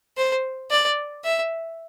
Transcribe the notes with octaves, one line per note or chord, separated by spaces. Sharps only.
C5
D5
E5